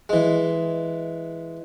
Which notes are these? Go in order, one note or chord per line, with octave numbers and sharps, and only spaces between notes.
E3 G#3